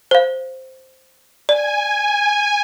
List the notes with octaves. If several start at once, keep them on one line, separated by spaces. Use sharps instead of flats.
C5 F5
D5 G#5